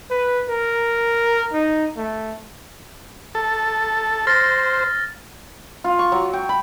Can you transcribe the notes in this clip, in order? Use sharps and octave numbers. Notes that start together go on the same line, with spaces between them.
B4
A#4
D#4
A3
A4
C5 F6 A6 A#6
F4
C#6
F#3
G5
B5